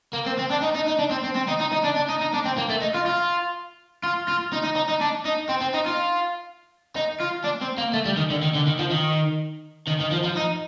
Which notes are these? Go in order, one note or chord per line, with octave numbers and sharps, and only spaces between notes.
A#3
C4
C4
D4
D#4
D#4
D#4
D4
C4
C4
C4
D#4
D#4
D#4
D4
D4
D#4
D#4
D4
C4
A#3
A3
D#4
F4
F4
F4
F4
D#4
D#4
D#4
D#4
D4
D#4
C4
C4
D#4
F4
D#4
F4
D4
C4
A#3
A3
G3
D#3
D3
D#3
D3
D#3
F3
D#3
D#3
D#3
F3
F3
D#4